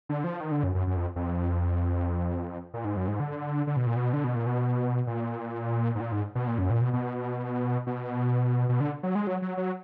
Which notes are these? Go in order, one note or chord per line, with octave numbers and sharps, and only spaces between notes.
D3
F3
D#3
D3
F#2
F#2
F#2
F2
F2
A#2
G#2
F#2
G#2
D3
D3
B2
A#2
B2
D3
B2
A#2
B2
A#2
G#2
A#2
G#2
B2
A#2
F#2
A#2
B2
B2
B2
B2
D3
F#3
G#3
F#3
F#3
F#3